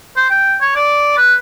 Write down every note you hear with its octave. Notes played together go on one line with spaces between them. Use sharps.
C5
G5
C#5
D5
B4